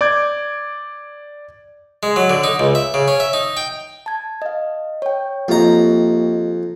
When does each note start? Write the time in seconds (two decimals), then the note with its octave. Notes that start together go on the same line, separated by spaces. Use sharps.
0.01 D5 D6 G6 G#6
2.03 G#3
2.16 F#3
2.30 D3
2.44 D#4
2.59 C#2
2.75 E5
2.94 C#3
3.08 C#4
3.20 E5
3.33 D#4
3.57 G5
4.06 A5 G#6
4.42 D#5 F5
5.02 C#5 G5
5.48 F2 A#3 G4 D#5 A#5